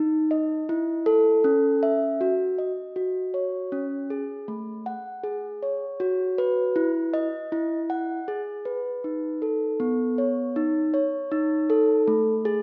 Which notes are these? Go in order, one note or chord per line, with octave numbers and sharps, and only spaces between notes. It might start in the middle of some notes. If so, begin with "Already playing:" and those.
Already playing: D#4
D#5
E4
A4
C#4
E5
F#4
D#5
F#4
C#5
C#4
G#4
A3
F#5
G#4
C#5
F#4
B4
E4
D#5
E4
F#5
G#4
B4
D#4
A4
B3
C#5
D#4
C#5
D#4
A4
A3
G#4